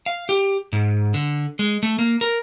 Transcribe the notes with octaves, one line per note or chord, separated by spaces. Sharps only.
F5
G4
G#2
D3
G#3
A3
A#3
A#4